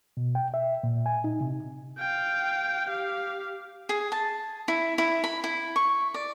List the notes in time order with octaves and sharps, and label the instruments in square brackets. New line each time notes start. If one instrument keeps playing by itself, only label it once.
[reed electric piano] B2
G5
E5
A#2
G#5
D#4
C3
[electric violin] F5 G5
G4 F5
[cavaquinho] G#4
A5
E4
E4
B5
E4
C#6
D5